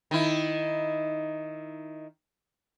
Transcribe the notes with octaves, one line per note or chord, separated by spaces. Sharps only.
D#3 E4